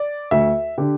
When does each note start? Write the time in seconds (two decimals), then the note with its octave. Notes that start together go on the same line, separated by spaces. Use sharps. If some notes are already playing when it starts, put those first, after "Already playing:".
Already playing: D5
0.31 D2 E5
0.78 D3 G4